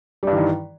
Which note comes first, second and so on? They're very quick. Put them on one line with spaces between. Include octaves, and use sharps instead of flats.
G3 G2 E3 D#3